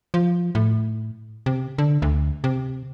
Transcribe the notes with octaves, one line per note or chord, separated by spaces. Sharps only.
F3
A2
C3
D3
D2
C3